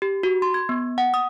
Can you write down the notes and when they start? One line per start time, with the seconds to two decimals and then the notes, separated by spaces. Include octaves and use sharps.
0.02 G4
0.23 F#4
0.42 C6
0.54 G#6
0.69 B3
0.98 F#5
1.14 D#6